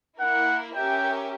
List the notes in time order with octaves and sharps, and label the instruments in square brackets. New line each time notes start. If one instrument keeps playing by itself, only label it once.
[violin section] A#3 E4 A#4 [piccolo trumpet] F#5
[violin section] C#4 G4 A#4 E5 [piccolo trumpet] G5